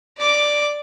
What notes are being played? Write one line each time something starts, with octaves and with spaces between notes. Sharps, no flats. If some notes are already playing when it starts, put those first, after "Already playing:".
D5 D6